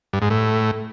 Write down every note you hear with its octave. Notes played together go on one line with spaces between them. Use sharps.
G2
G#2
A2